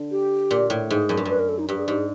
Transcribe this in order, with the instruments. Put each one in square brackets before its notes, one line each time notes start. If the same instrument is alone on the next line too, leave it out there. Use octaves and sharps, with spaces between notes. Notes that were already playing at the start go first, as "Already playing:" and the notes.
Already playing: [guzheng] D3
[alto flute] G4
[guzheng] A#2
A2
[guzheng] G#2 [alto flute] G#4
[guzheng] F#2
G2
[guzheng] F#2 [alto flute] B4
[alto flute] A#4
A4
D#4
[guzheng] G2 [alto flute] G4
[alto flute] G#4
[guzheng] G#2 [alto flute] G4
[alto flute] G#4